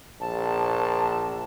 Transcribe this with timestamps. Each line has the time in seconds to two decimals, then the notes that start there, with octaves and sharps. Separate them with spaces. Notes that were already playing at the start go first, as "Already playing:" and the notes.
0.20 A#1 A5